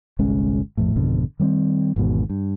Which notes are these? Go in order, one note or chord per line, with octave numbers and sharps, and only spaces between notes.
G1 C2 G#3 C#4
A#1 F2 A2
G#1 F2 B2 D3
D#3 G3 A3 C4
G#1 E2 G#2 B2
G2